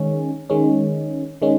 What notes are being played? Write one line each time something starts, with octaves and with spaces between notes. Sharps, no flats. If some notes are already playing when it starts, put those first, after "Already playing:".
Already playing: D#3 G#3 C#4
D#3 G#3 C#4
D#3 G#3 C#4